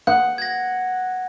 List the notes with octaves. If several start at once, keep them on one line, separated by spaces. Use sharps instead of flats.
F#5 G6
G#6 A#6